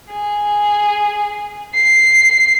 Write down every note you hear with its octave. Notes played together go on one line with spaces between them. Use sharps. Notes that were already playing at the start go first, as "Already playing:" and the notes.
G#4
C7